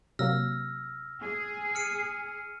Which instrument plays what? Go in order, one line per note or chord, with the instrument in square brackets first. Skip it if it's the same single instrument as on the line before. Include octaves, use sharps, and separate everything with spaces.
[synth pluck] C3 F#3 A#3 [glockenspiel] E6 F6 A#6
[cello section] G#4
[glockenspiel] F6 C#7 D#7